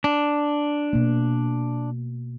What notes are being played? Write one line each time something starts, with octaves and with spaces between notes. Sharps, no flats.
D4
B2 A#3